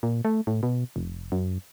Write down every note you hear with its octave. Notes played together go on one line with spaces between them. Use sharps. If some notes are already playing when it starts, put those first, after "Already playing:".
A#2
A3
A2
B2
F1
F#2